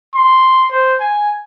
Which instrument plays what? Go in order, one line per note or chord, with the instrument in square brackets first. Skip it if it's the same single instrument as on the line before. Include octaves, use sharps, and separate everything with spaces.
[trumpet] C6
C5
G#5